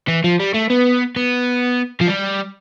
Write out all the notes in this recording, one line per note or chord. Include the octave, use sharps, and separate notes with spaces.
E3
F3
G3
A3
B3
B3
F3
G3